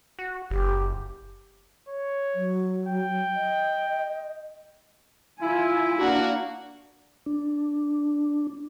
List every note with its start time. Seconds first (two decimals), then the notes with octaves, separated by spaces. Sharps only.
0.19 F#4
0.51 F#1 G4
1.89 C#5
2.35 F#3
2.88 G5
3.36 D#5
5.41 E4 F4 G#5
5.99 A#3 D4 F#4
7.26 D4